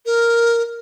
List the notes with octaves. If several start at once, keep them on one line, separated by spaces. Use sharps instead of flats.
A#4